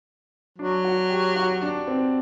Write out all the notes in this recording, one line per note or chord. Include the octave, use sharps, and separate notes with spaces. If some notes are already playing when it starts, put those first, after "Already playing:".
F#3 D4
F#4
G4
F#4
D4
C4